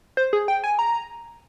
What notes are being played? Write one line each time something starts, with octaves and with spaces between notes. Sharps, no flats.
C5
G#4
G5
G#5
A#5